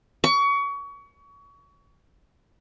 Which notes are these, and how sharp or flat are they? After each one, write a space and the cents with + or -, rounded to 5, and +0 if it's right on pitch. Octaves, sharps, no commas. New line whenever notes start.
C#6 +30